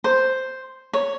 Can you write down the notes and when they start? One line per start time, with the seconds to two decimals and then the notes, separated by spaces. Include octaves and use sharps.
0.04 C5
0.93 C#5